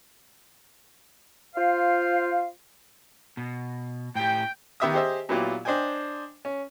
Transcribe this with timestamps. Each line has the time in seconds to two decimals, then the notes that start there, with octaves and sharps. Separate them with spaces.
1.56 F4 C5 F5
3.37 B2
4.15 A2 G4 G5
4.80 D#3 B3 G4 E5 D6 D#6
4.94 G4 G#4 C5 D#5 E5
5.29 A#2 F#3 B3 E4 F4 G4
5.65 D4 C5 D#5 G5 G#5
6.45 C#4